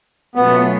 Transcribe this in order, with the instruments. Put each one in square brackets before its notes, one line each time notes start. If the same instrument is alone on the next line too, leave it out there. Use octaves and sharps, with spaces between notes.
[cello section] B2 F#3 A3 C#4 F4 [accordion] B3